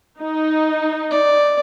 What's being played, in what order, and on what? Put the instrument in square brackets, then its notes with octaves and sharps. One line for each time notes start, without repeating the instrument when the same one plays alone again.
[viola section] D#4
[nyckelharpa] D5